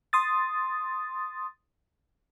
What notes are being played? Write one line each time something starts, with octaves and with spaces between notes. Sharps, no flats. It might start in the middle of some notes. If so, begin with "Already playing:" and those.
C6 D#6 A6